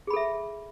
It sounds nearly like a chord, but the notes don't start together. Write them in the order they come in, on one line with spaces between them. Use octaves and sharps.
G#4 B5 A4 E5